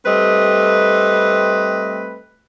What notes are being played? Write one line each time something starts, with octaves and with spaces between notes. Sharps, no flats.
G3 A3 C4 B4 D#5